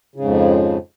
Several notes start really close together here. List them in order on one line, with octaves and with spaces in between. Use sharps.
C#3 G#2 F2 F3